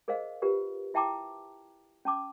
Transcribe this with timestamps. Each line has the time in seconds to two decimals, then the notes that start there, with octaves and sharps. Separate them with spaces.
0.08 G#4 A#4 C5 D#5 F5
0.42 F4 G4 A#4 B4
0.94 E4 E5 G5 A5 A#5 D6
2.05 C#4 A5 D6